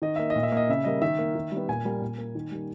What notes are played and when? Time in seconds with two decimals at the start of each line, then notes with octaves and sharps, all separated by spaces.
0.02 D#3 D#5
0.16 A#3 E5
0.30 D#5
0.36 A#2
0.43 E5
0.52 A#3 D#5
0.69 C#3 E5
0.84 G3 A#3 D#5
1.02 D#3 E5
1.19 A#3
1.35 D#3
1.52 G3 B3
1.69 A#2 G#5
1.85 G3 A#3
2.02 A#2
2.18 A#3
2.35 D#3
2.52 G3 A#3